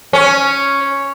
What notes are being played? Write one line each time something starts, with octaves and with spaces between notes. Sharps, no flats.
C#4